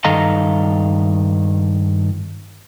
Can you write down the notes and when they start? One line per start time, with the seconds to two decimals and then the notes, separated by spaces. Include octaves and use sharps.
0.05 G2 D#3 A4 D#5 F5 A#5